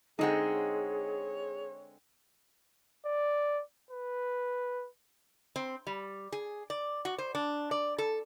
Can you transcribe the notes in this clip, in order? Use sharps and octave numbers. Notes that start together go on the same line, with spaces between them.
D3 G#3 C4 D#4 G#4 A4 F#5
C#5
D5
B4
C4
G3
G#4
D5
F#4
C5
D4
D5
A4